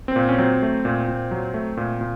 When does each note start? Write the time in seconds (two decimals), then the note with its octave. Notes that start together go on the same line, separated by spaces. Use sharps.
0.08 C4
0.16 A#2
0.29 C#4
0.38 F#3 C4
0.62 A3
0.85 A#2
1.08 A#2
1.31 F#3
1.54 A3
1.77 A#2
2.01 A#2